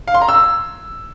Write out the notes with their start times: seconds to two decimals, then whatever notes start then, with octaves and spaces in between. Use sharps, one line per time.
0.08 F5
0.15 C6
0.22 A#5
0.29 E6